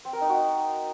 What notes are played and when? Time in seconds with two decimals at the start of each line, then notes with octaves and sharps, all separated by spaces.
0.05 C4
0.13 A#4
0.21 D#4
0.29 F#4